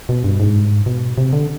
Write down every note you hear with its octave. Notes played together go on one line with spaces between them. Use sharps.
B2
G2
G#2
B2
C3
D3